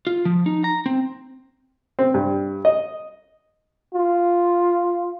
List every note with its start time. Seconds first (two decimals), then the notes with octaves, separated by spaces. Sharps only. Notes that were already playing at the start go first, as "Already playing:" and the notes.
0.07 F4
0.25 F3
0.46 D#4
0.64 A#5
0.86 C4
1.99 C4
2.14 G2
2.65 D#5
3.94 F4